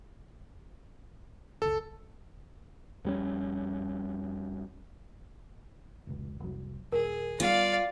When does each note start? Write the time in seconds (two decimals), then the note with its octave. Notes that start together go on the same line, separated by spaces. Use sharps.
1.62 F#1 C#2 A4
3.05 F2 G3 C#4
6.07 F1 C#2
6.40 F1 C2 F#3
6.92 D#1 G#4 A#4
7.40 G3 B3 F4 D5 F5